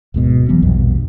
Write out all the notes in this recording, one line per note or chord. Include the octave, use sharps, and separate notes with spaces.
D1 G#2 B2
F1 E3 F#3 B3
A#1 E2 G2 B2